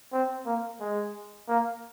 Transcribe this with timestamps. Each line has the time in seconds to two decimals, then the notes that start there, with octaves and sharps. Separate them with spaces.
0.13 C4
0.46 A#3
0.80 G#3
1.48 A#3